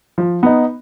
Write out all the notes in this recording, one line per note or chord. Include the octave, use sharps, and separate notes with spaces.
F3
B3 D#4